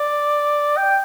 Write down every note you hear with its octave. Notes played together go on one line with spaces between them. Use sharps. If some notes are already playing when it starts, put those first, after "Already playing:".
Already playing: D5
G5